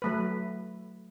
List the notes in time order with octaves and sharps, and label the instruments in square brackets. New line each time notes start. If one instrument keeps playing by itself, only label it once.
[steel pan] F#3 A3 B4